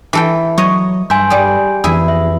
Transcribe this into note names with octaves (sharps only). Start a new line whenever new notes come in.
E3 A4 G5
F#3 C#5 D#5
G2 E5 G#5 C6 G6
G3 G#4
F2 E3 E4 G#4
E5